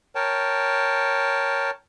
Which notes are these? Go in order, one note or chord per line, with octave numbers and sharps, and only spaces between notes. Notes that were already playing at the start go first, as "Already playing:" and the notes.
A#4 C#5 G5 A5